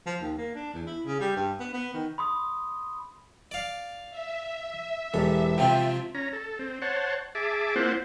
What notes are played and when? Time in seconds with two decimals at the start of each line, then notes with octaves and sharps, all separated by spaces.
0.06 F3
0.21 D#2
0.38 A#3
0.55 D4
0.73 E2
0.87 E4
1.06 C#3
1.20 G3
1.36 G2
1.60 B3
1.73 B3
1.94 D#3
2.18 B5 C6 D#6
3.51 D5 F5
4.10 E5
5.14 E1 G4 A4
5.58 C3 F3 C4 F4 G5
6.15 C#4 A#5
6.33 A4
6.59 C4
6.82 C5 C#5 F#5 A5
7.35 G#4 E5 A5 D6
7.76 A#3 C4 E4 F4 C5 F#5